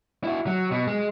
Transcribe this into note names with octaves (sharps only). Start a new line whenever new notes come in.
E4 F#4
F#3
B2
G#3